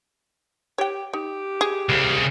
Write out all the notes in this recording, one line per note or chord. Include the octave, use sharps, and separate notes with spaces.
G4 C#5 G5
D#4 G4
G#4
C2 C#3